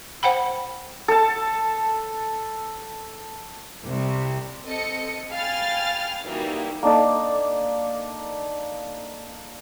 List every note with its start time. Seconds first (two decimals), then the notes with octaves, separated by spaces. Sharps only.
0.23 C5 F#5 G5 B5
1.08 A4 A5
3.84 C2
4.64 C4 A4 D#5 C#7
5.31 F5 G5 G#5 B5 F6 A6
6.24 E3 G3 A#3 D#4 E4 F#4
6.83 A#3 D4 D#4 A4